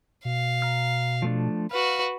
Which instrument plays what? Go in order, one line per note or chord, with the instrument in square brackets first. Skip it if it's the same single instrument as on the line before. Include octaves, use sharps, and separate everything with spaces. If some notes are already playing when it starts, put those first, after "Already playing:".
[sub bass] B2 [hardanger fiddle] F5
[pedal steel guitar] A#5 F6
F3 A3 D4
[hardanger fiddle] F#4 B4 [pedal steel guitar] F5